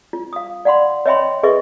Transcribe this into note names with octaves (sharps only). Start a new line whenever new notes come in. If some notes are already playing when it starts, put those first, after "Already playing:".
F4
F5 D#6
D5 F5 F#5 B5 C6
C#5 D#5 E5 G5 B5 C6
G#4 A4 B4 D#5 E5 C#6